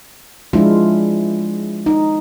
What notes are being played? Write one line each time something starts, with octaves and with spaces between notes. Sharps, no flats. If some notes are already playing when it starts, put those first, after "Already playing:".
F3 G#3 D4 E4 F4
D#4